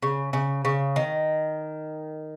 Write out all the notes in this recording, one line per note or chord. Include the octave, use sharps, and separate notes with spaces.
C#3
C#3
C#3
D#3